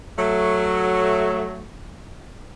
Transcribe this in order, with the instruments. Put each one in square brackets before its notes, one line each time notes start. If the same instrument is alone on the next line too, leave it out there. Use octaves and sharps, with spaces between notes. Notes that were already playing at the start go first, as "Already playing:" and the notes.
[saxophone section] F#3 A3